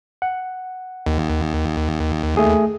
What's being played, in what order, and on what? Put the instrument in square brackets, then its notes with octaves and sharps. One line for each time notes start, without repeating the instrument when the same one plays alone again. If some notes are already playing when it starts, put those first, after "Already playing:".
[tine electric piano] F#5
[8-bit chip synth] D#2
[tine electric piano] A3 G#4